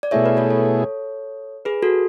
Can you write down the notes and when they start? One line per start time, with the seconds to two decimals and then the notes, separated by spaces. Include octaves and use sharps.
0.03 D5
0.11 B2 A3 E4 G#4 C#5 E5
0.26 B4
0.37 A4 C#5
0.50 A4 C#5
1.65 G#4 B4
1.82 F#4 A4